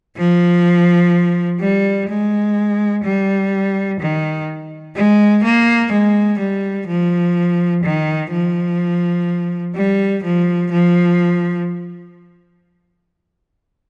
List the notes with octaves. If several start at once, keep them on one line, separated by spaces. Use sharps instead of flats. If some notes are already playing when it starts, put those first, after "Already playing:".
F3
G3
G#3
G3
D#3
G#3
A#3
G#3
G3
F3
D#3
F3
G3
F3
F3